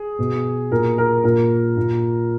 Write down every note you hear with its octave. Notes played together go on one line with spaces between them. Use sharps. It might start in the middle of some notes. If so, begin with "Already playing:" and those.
Already playing: G#4
B2
A#2 A#4
A#4
A#2 A#4
A#2